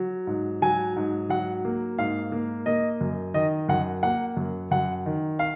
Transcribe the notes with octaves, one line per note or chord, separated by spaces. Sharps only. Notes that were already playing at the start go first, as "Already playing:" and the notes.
Already playing: F#3
G#2
F#3 G#5
G#2
F#3 F#5
A#3
G#2 F5
A#3
A#3 D#5
F#2
D#3 D#5
F#2 F#5
A#3 F#5
F#2
F#2 F#5
D#3
F5